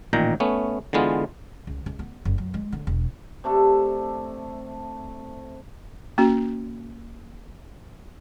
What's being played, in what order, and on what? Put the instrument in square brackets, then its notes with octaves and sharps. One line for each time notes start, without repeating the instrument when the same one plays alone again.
[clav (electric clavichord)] A1 A#2 D#3 G5 A#5
A3 B3 C#4
D3 E3 G#3 B3 F4
[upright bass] C#2
C#2
B3
F#1
F#2
G#3
D3
E1
[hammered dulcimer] C3 A3 D4 A4
[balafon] A#3 C#4 F#4